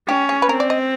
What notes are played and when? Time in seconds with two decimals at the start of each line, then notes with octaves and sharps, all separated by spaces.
0.08 C#4 G4
0.29 G#4
0.42 B4
0.49 C4 A#4
0.60 D5
0.70 D#5